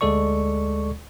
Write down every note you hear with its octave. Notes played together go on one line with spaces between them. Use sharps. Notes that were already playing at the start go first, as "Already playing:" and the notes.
D2 G#3 A4 D5 C#6